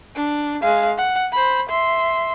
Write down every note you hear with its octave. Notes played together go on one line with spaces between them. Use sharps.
D4
G#3 F5
F#5
C5 B5
E5 C6